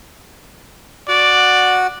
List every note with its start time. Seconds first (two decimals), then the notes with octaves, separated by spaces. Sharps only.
1.09 F#4 D5 F#5